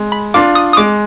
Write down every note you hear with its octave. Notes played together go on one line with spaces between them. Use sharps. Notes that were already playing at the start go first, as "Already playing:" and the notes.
Already playing: G#3
B5
D4 F4 D6
D#6
D#6
G#3 D6